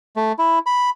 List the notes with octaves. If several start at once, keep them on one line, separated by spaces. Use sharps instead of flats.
A3
E4
B5